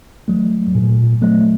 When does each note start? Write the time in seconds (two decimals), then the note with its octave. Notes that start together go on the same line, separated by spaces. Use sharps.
0.28 F#3 A3
0.75 A#2
1.22 F#3 A3